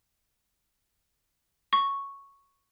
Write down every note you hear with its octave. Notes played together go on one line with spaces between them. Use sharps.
C#6